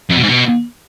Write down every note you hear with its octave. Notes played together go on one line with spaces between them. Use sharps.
F2
B2
G#2
B2